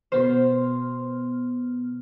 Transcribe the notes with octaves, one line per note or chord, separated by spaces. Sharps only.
B2 B3 C5 F6